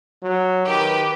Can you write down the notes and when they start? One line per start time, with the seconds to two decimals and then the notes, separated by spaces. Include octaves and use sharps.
0.22 F#3
0.67 D#3 G4 B4